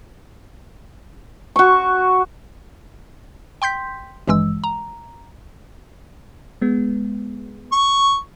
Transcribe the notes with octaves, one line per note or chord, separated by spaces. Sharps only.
F#4 C#6
G5 C6 G6 B6
G#1 G2 E3 G#3 E6
A#5
G#3 B3
C#6